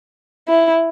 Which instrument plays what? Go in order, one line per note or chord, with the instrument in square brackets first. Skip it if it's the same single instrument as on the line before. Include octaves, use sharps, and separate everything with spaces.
[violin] E4